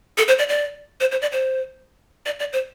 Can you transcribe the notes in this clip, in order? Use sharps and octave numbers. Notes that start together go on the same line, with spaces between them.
A4
C5
D5
D5
C5
C5
D5
C5
D5
D5
C5